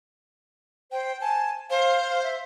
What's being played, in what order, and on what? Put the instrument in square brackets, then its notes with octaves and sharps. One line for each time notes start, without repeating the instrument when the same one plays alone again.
[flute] C5 [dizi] G5
[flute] G#5 [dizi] A5
[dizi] C5 [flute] F5
[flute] E5